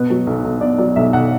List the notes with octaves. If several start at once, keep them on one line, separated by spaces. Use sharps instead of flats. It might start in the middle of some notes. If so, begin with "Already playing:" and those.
Already playing: B2 B4
F#3
B1
B1
B2 D5
F#3 D5
B1 E5
B1 F#5